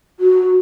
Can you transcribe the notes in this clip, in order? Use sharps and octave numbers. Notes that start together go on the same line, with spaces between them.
F#4